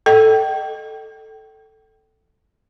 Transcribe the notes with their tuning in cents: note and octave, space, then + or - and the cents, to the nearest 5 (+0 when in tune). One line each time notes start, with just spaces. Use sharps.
A4 +0 D#5 -15 G5 -25